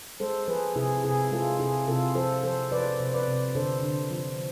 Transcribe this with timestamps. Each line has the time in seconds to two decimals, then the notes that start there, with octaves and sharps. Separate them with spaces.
0.20 G#3 A4 C5
0.48 F3 G#4 B4
0.76 C3 E4 G#4
1.04 C3 E4 G#4
1.32 G#3 F4 A4
1.59 C3 E4 G#4
1.88 C3 F4 A4
2.15 F3 A4 C5
2.43 F3 A4 C5
2.72 F3 B4 D5
2.99 C3
3.13 B4 D5
3.27 C3
3.55 D3 A4 C5
3.83 D3
4.11 F3